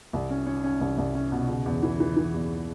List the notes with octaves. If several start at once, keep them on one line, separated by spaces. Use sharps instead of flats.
C2
C#4
C#4
C#4
C2
C2
C#4
B2
C#3
E2
E3
E3
E3
E2